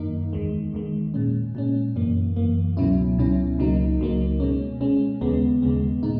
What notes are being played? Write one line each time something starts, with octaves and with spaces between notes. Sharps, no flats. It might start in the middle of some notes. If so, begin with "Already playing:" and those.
Already playing: F#2 D#3 A#3 D#4
E2 D#3 G#3
E2 D#3 G#3
A#2 G#3 C#4
A#2 G#3 C#4
F#2 E3 A#3
F#2 E3 A#3
C#2 B2 F#3 C#4 E4
C#2 B2 F#3 C#4 E4
C#2 C#3 F#3 A#3 D#4
C#2 C#3 F#3 A#3 D#4
B2 G#3 C#4
B2 G#3 C#4
D#2 C#3 G#3 B3
D#2 C#3 G#3 B3
A#2 G#3 D#4